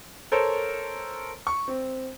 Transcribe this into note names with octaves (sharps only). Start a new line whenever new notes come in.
A4 A#4 C5 C#5
C#6
C4